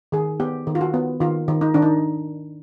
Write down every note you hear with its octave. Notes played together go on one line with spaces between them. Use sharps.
D#3 G#4
B3 G4
D#3
F4
F#4
B3
D#3 F4
D#3
D#4
D#3 D4
D#4